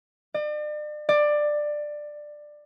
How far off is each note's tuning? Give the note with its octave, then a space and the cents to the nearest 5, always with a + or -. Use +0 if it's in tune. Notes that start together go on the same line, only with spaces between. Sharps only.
D5 +40
D5 +15